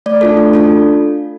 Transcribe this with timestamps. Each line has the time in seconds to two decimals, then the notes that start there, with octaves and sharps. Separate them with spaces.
0.06 A3 D5
0.21 D4 F4 A4
0.37 A3
0.53 D4 F4 A4